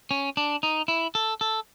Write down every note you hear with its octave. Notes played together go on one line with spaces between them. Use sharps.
C#4
D4
D#4
E4
A4
A4